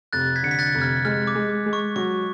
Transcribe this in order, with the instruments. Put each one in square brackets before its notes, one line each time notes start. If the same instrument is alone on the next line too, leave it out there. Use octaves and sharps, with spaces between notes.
[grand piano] F1 [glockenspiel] F#6 A6
[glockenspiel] G#6 B6
[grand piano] D3 [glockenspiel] C#7
[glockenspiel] B6
F#6 A6
[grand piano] F1
[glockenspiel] F6 G#6
[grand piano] G#3 [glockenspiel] F6
[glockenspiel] D6
[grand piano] G#3
[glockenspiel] D6
[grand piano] G#3
[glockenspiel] C#6
[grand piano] F#3 [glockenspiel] C#6